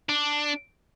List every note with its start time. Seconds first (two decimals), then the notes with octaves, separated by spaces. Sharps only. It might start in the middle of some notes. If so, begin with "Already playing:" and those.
0.09 D4